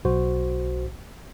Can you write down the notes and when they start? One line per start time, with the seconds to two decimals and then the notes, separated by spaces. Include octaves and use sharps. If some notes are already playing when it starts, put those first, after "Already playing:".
0.05 B1 F#4 C5